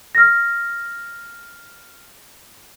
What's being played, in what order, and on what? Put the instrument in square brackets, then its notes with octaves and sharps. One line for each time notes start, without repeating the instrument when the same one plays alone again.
[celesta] F6 A#6